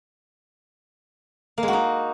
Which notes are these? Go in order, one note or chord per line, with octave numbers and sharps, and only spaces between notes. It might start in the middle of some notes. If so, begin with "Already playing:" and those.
A#3
G#3
F#4
D#4